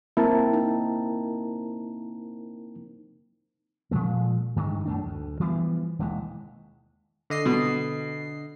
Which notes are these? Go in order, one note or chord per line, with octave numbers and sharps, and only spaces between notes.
A#3 C4 E4 A#4 A5
D#4
A#2 F3 G#3 A3
G2 D3 D#3 G#3
F#2 A3 D4
D2
E3 F3 G3 B3
E1 D#2 E3 G#3
D3 D#5 C7
B2